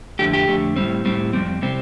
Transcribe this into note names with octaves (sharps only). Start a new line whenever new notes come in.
F2 D3 A3 G4
G4
F2 D3 A3
A2 G3 C4
A2 G3 C4
F2 C3 G3 C4
C3 G3 C4